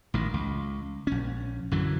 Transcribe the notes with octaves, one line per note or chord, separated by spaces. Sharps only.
A1 D#3
C#2
A#1 C#4
F#2 D3 E3 F#3